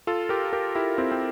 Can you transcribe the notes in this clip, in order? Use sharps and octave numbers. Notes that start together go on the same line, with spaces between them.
F4 A4
G4 A#4
G4 A#4
E4 G4
C4 E4
C4